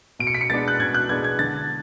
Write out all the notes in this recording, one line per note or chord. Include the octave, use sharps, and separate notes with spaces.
B2 D7
C#7
B6
C#7
G#3 B3 D4 A6
F#6
B2 G#6
F#6
G#3 B3 D4 G#6
G#6
D3 A6